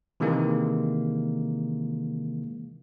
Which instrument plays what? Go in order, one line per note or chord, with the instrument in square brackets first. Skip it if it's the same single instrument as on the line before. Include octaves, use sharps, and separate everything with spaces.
[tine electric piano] C3 D#3 E3 G#3 A#3